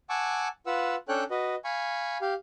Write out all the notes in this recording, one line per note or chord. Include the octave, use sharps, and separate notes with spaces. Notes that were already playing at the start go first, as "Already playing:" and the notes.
F#5 G#5 A5 C#6 D6 E6
F4 B4 F#5 E6
C#4 D4 A4 C#5 G5 F#6
F#4 B4 D#5
F5 G#5 B5 C#6
G4 F5